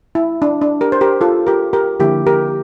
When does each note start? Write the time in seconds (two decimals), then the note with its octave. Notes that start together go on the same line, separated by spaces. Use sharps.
0.15 E4
0.42 D4
0.62 D4
0.81 G4 A#4
0.92 C5
1.01 G4 A#4
1.21 F4 A4
1.47 G4 A#4
1.73 G4 A#4
1.99 D3 F3 A#3 E4 G4
2.27 G4 A#4